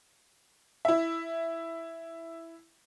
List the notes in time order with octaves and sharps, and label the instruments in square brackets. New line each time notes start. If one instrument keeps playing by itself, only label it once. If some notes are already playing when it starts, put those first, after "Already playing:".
[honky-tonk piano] E4 E5